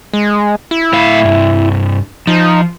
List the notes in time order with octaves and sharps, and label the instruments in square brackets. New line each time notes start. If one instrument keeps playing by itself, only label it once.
[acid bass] G#3
E4
[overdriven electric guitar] A2 F5
C2 G2
[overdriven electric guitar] F3 [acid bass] D#4